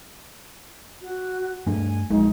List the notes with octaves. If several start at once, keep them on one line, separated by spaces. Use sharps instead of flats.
F#4
G2 A3 D4 G#5
A#1 G#3 D#4